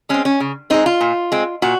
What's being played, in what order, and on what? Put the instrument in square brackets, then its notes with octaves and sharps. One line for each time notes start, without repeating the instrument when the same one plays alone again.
[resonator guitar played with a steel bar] G#3 C4 C#4
C#4
C#3
G#3 C4 D#4
F4
A#2
G#3 C4
A#2 F#4